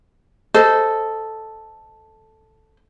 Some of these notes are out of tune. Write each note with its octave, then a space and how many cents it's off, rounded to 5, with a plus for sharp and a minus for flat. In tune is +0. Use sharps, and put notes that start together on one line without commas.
A4 +0 C5 -15 D#5 +0